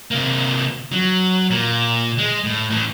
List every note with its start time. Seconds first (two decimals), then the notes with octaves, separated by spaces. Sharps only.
0.11 C3 A#3
0.92 F#3
1.50 A#2
2.18 G#3
2.44 A2
2.70 A2 E3